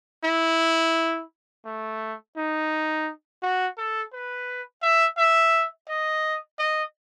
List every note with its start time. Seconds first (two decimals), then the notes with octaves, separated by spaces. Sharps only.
0.24 E4
1.65 A3
2.37 D#4
3.42 F#4
3.78 A4
4.13 B4
4.82 E5
5.17 E5
5.88 D#5
6.59 D#5